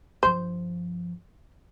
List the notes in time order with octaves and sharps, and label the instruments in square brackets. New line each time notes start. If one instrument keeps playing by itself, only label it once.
[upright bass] G2 F3 [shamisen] C5